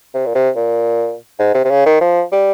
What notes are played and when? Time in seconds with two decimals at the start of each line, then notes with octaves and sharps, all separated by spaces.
0.14 C3
0.26 A#2
0.35 C3
0.56 A#2
1.39 G#2
1.54 C3
1.65 C3
1.70 C#3
1.86 D#3
2.01 F3
2.32 G3